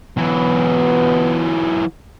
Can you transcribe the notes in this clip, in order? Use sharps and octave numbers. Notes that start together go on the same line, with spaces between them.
E3 F#3 B3